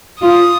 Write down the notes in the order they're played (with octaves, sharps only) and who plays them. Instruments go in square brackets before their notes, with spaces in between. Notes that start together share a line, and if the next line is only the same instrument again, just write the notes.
[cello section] F4 [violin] D#6